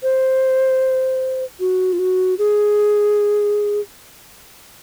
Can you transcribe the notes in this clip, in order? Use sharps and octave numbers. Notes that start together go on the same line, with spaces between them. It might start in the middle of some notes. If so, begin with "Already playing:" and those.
C5
F#4
F4
F#4
G#4